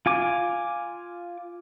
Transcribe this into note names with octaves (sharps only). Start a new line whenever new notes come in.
F4 G#5 D6